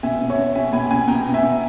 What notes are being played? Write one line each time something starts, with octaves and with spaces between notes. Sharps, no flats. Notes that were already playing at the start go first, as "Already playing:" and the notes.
B2 E5 G#5
B2
C#5 E5
B2
B2 E5 G#5
B2 G#5 B5
B2 G#5 B5
B2 G5 A#5
B2
E5 G#5
B2